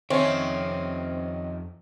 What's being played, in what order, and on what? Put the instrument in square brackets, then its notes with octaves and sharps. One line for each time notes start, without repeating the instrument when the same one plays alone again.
[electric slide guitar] F2 E5 [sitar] D#3 C#4 [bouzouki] C4 [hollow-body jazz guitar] C#5